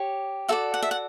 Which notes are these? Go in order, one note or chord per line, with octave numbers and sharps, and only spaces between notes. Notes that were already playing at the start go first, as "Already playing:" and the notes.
Already playing: G4 C#5
F#4 A4 D5 E5
F#5
E5
F#5